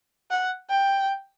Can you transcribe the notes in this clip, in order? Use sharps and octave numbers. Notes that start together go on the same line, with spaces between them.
F#5
G5